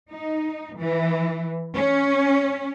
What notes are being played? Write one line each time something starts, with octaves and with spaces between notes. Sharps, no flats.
D#4
E3
C#4